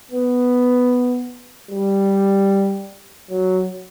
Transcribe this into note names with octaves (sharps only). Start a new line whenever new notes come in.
B3
G3
F#3